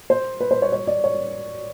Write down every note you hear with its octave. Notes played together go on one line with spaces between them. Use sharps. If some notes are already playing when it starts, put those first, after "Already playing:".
C5
B4
C5
C#5
C#5
D5
C#5